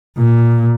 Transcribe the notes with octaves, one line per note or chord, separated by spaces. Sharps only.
A#2